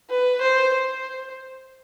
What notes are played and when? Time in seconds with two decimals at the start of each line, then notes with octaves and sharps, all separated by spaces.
0.10 B4
0.41 C5
0.74 C5